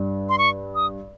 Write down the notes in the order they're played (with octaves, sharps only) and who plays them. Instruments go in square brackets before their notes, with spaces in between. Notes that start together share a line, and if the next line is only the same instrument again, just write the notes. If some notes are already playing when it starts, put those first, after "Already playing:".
Already playing: [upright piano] G2
[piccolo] C6
C#6
D#6